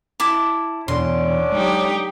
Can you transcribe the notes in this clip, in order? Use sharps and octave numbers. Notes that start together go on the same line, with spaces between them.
E4 A5 D6
E2 B2 D3 E3 C#4 D4 C6
F#3 G#3 D#4 G4